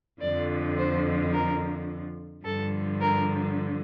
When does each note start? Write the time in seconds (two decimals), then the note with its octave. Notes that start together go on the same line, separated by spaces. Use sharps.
0.21 F2 D3 F3 D5
0.78 C5
1.33 A#4
2.45 G2 D3 F3 A4
3.01 A#4